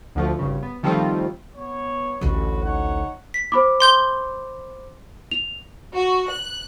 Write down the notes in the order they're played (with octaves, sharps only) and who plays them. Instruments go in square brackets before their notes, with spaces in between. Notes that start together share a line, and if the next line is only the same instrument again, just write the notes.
[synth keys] D2 D3 F3 A3
G#1 G2 C#3
B3
D#3 F3 G3 A3 C4 F4
[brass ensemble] B3 C#5
[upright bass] A1 D2 [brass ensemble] C#4 F#4 B4
[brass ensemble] D#4 C#5 F#5
[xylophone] B6
[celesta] C5 B5 D6
[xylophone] C6 G6 G7
[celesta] F7
[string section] F#4
F#6